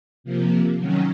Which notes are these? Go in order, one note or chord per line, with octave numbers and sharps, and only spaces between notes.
C3 F3 A#3
D#3 F#3 C#4